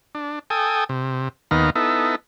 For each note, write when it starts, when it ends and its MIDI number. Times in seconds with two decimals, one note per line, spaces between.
0.15 0.39 62
0.50 0.84 69
0.50 0.84 79
0.50 0.84 80
0.50 0.84 87
0.89 1.29 48
1.51 1.70 39
1.51 1.70 51
1.51 1.70 59
1.51 1.70 77
1.51 1.70 82
1.76 2.15 59
1.76 2.15 63
1.76 2.15 64
1.76 2.15 69